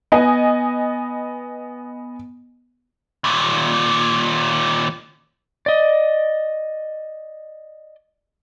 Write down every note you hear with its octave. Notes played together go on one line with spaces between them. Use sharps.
B3 D#5 G#5
D#2 A#2
D5 D#5